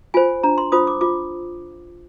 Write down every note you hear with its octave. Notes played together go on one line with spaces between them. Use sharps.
F4 C5 G#5
D4 A#5
C6
F4 C5 D#6
D6
F4 D6